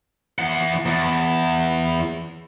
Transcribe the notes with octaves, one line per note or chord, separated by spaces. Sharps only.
E3 F#5
E2